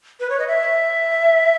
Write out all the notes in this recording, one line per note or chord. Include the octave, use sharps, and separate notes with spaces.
B4
C#5
D#5
E5